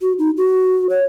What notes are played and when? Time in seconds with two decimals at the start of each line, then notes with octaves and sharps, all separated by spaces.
0.01 F#4
0.19 D#4
0.37 F#4
0.90 C#5